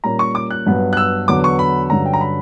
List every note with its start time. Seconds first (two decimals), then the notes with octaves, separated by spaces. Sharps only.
0.04 A#2 G3 A#3 C#4 A#5
0.19 C#6
0.35 D6
0.51 F#6
0.66 G2 F#3 B3
0.93 F#6
0.97 E6
1.28 E2 D3 F#3 B3 D6
1.44 C#6
1.59 B5
1.90 G2 D3 F#3 C#4 A#5
2.06 G5
2.14 A#5
2.21 B5